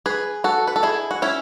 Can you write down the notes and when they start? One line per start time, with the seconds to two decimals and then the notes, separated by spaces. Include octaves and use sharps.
0.06 G#4 B4
0.44 F#4 A4
0.67 B4
0.76 A4
0.83 E4 G#4
1.11 F#4
1.22 C#4 E4